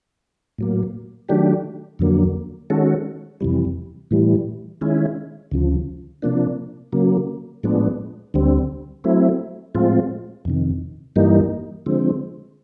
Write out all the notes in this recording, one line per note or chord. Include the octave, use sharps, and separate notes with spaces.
A2 F#3 A#3
D#3 F#3 A3 D4 G4
F2 D3 F#3 A#3
D#3 G#3 C#4 F#4 A4
F2 C3 E3 G3
A2 E3 G3
D#3 G#3 C#4 E4
D2 C#3 F3
C3 F3 A#3 D4
C#3 F#3 A#3
A2 F3 G#3 B3 D4
D2 D3 G3 C4
F#3 A3 C4 E4
A2 F3 G#3 C4 F4
F2 C3 D#3
G2 E3 G3 A#3 D#4
D3 F3 G#3 C4